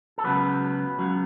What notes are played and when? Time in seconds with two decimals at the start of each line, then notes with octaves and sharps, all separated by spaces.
0.18 A4
0.24 C#2 C#3 F#3 B3 B4
0.99 C#2 C#3 F#3